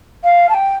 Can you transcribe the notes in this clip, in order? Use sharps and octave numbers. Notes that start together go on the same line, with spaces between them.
F5
A5
G5